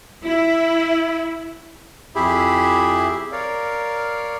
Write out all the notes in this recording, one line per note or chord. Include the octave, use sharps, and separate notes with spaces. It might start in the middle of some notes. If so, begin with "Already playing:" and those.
E4
F2 E4 G4 G#4 E5 B5
A#4 C#5 D5 F5